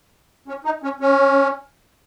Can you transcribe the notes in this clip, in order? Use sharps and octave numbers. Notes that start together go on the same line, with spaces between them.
C#4
D#4
C#4
C#4